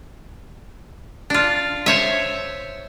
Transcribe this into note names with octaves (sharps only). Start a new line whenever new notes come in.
D4 F4
C5 C#5 E5